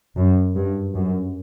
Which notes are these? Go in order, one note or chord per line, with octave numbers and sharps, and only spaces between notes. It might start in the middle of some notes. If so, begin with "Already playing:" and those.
F#2
G2
F#2